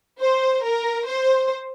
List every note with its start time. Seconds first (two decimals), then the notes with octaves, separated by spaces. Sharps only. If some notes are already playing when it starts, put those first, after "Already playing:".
0.21 C5
0.64 A#4
1.07 C5